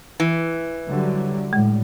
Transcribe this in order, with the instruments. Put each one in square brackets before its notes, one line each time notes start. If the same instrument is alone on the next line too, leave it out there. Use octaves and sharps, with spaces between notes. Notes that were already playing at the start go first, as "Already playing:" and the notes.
[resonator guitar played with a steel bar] E3
[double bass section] D3 F#3 G3
[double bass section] A2 G3 [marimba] G#3